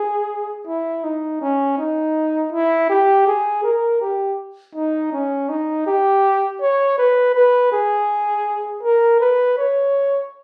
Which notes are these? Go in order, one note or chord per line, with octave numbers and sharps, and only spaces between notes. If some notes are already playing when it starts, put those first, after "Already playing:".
Already playing: G#4
E4
D#4
C#4
D#4
E4
G4
G#4
A#4
G4
D#4
C#4
D#4
G4
C#5
B4
B4
G#4
A#4
B4
C#5